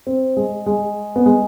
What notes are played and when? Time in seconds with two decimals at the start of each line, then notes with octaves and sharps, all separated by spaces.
0.07 C4
0.37 G#3
0.66 G#3
1.16 B3
1.26 G#3